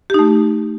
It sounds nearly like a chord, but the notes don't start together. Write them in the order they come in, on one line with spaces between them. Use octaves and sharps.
G4 D#4 A3